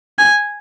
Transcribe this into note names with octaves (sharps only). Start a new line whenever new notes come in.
G#5